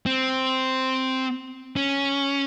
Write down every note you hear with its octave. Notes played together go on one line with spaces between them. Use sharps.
C4
C#4